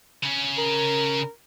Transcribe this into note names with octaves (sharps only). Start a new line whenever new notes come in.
C#3 C#4
A#4